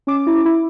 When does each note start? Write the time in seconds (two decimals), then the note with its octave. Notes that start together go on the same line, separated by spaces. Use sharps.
0.07 C#4 D6
0.27 E4
0.45 E4